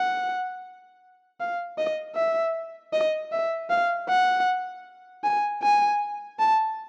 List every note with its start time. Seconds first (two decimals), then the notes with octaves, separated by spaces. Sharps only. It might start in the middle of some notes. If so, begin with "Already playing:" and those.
Already playing: F#5
1.40 F5
1.78 D#5
2.16 E5
2.93 D#5
3.32 E5
3.70 F5
4.09 F#5
5.24 G#5
5.63 G#5
6.39 A5